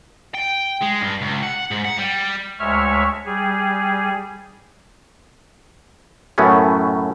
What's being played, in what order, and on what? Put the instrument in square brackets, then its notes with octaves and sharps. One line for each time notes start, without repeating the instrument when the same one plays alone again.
[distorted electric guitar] G5
G#3
G2
C#2
F#5
G#2
F#5
G3
[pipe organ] D2 G#3 C#5 E5 C#6 F6
G3 G#4
[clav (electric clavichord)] F#2 A2 F#3 A3 B3 C#4